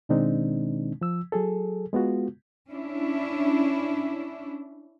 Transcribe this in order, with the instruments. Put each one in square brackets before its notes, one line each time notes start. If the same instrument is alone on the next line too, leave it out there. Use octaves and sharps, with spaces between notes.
[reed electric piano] B2 D#3 G#3 C4 D4 D#4
F3 E6
F#3 G#4 A4
G#3 B3 F4 F#4
[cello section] C#4 D4 E4